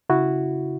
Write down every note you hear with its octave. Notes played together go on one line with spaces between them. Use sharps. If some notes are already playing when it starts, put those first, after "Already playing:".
C#3 E4 F#4